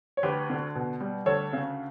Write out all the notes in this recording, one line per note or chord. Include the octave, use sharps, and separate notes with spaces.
C#5
D2 G4 B4
D3
B2
G3
D2 A4 C#5
C#3